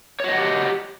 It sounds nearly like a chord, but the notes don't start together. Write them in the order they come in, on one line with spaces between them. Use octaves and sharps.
C#5 F#4 D#5 F#5 G4